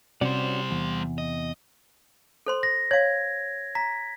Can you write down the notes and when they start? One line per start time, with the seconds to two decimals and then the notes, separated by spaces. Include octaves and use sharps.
0.21 C3 G3 C4 C#4 F#4 C5 D5
0.71 E2
1.18 D#5
2.46 A4 C5 C6
2.63 A#6
2.91 C#5 F5 G#6
3.75 A#5 B6